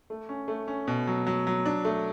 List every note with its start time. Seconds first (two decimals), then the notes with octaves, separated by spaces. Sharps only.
0.10 A3
0.29 C#4
0.48 A3
0.68 C#4
0.88 B2
1.07 F#3
1.27 F#3
1.47 F#3
1.66 D4
1.85 A3